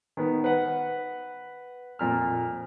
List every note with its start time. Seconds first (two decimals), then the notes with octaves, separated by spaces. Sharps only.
0.17 D#3 B3
0.44 B4 F#5
1.99 F2 A#2 F6